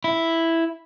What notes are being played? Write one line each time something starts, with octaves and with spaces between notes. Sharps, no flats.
E4